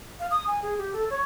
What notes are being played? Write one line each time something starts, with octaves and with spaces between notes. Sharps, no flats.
F5
D#6
G#5
G#4
G4
A4
C#5